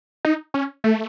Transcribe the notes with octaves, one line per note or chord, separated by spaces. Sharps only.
D#4
C#4
A3